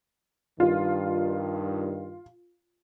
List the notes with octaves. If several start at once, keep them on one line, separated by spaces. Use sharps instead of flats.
G2 D#3 F4